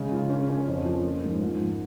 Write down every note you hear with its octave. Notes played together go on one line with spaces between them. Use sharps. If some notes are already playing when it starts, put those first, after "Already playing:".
Already playing: C#3 G#3
F4
C#4
C#4
F2
F3
A#3
G#2
G#2
A#3